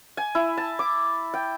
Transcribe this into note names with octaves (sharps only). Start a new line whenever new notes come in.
G#5
E4
A5
D6
G5